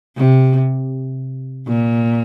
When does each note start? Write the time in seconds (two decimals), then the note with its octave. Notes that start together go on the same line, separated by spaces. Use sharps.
0.17 C3
1.67 A#2